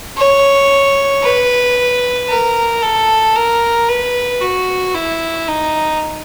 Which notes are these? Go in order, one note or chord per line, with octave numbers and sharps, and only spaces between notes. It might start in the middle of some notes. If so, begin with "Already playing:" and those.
C#5
B4
A#4
A4
A#4
B4
F#4
E4
D#4